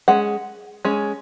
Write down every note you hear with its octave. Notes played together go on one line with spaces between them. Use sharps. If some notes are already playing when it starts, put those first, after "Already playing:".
G#3 C#4 F#5
G#3 C#4